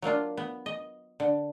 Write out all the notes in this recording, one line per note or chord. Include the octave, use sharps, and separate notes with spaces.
F#3 A#3 D4 F4
B3
D#5
D3